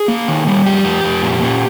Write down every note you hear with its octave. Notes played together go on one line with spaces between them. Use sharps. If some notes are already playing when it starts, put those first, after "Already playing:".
Already playing: G#4
A#3
D#3
G3
F2 G4
F2
F2
A#2
A#2